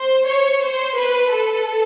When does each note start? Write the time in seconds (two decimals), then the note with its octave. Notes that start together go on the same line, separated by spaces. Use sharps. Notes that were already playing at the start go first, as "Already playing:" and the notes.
Already playing: C5
0.27 C#5
0.62 C5
0.97 B4
1.32 A4